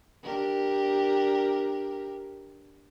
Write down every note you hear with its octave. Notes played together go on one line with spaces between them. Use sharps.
D4 G4 A#4